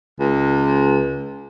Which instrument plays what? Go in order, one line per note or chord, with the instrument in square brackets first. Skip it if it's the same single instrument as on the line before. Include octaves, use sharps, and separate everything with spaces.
[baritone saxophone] C#2